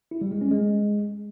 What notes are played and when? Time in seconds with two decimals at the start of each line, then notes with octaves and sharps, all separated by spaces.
0.11 E4
0.21 G3
0.31 G#3
0.41 C#4
0.51 G#3